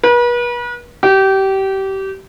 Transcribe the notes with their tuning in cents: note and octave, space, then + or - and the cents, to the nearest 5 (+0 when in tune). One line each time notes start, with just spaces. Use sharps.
B4 -40
G4 -25